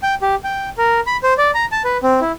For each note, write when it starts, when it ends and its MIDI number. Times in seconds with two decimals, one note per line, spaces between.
0.03 0.15 79
0.22 0.35 67
0.44 0.69 79
0.78 1.00 70
1.07 1.17 83
1.23 1.34 72
1.38 1.51 74
1.54 1.65 82
1.72 1.82 81
1.84 1.97 71
2.03 2.20 60
2.21 2.32 64